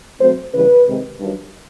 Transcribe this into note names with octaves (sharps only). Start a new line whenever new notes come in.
B2 F#3 A3 C4 C5
E2 C#3 E3 G3 B4
C3 D#3 G#3
G2 D#3 F#3